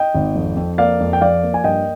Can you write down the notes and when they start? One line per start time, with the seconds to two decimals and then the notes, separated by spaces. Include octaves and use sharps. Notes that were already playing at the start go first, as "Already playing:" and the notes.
Already playing: D#5 G5
0.14 G#1
0.35 F2
0.56 F2
0.78 A#3 D5 F5
1.00 F2
1.13 G5
1.21 F3 D5 F5
1.43 A#3
1.54 G#5
1.64 G2 D#5 G5